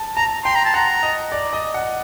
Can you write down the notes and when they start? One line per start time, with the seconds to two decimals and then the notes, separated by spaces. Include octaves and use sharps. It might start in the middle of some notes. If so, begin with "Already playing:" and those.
Already playing: A5
0.16 A5 A#5
0.45 G5 C6
0.55 A#5
0.65 A5
0.74 F#5 A#5
1.03 D#5
1.32 D5
1.53 D#5
1.74 F#5